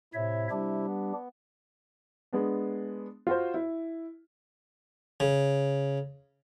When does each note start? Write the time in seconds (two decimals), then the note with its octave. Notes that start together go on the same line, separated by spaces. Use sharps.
0.14 A2 C3 E4 C#5 E5
0.51 G3 D4 G4
0.87 B3
2.33 G#3 B3 D4
3.27 F4 F#4 C5
3.54 E4
5.20 C#3